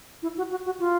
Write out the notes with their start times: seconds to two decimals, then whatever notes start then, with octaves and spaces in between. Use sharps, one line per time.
0.23 E4
0.38 F#4
0.51 F#4
0.66 F#4
0.80 F4